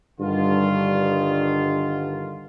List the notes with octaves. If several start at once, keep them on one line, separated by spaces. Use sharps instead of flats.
G2 D3 D#3 F4